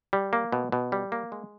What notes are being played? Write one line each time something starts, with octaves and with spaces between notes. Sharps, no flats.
G3
A#3
B2
B2
G3
A#3
G#3